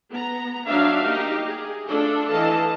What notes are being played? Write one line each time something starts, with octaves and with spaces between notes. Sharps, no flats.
B3 A#5
F#3 D4 D#4 E5 F5
A#3 D#4 G4
G#4
A3 D4 F4 A4
E3 A4 D#5 F5 A5